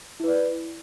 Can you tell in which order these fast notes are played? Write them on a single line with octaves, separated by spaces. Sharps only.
E4 B4 D5